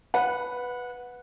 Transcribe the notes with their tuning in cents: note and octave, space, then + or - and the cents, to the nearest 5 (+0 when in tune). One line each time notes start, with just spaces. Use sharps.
B4 +0 F#5 -20